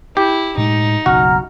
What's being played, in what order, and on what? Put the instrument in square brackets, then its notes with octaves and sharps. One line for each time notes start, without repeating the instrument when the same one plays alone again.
[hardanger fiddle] E4 [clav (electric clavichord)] G4
[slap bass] A2 G#3 [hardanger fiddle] D#4
[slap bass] F#1 B1 C#4 [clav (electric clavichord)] F#4 [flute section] F#5 A#5 F6